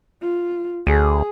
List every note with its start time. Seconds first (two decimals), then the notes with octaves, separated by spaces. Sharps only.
0.22 F4
0.87 D2 G#4